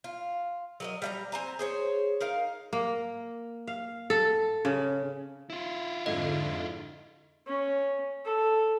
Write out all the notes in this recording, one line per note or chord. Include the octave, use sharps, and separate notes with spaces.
F4
F#3 A#4 D#5
G3 F5 A#5
C4 G#5 A#5
G#4 C5 C#5
D#4 A#4 F5
A#3
F5
A4
C#3
E4 F4
F2 G#2 D3 D#5
C#4
A4